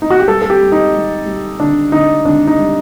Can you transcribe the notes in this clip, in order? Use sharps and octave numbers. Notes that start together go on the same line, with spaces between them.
D#4
F#4
G4
G3 A4
A4
G4
G3
D#4
G3
G3
D3 D4
D3 D#4
D3 D4
D#4
G3